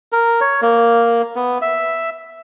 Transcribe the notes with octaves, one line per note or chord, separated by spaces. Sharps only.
A#4
C#5
A#3
B3
E5